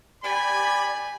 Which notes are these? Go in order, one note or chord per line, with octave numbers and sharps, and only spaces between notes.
G4 D5 G#5 B5